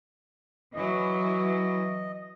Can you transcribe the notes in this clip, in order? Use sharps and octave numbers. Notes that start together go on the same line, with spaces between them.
E3 F#3 D#5